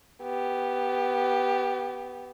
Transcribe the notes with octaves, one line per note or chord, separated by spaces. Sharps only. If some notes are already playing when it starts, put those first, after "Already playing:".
B3 G4